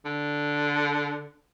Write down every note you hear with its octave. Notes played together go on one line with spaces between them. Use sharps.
D3